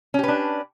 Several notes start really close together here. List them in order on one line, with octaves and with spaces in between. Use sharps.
C#4 G4 B4 D4